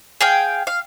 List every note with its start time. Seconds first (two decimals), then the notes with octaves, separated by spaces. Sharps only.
0.21 G#4 F5 G5
0.67 F5